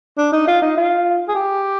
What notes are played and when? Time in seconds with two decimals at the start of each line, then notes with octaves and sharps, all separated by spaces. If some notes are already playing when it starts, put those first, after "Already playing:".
0.18 D4
0.32 D#4
0.47 F4
0.62 D#4
0.77 F4
1.28 G#4
1.35 G4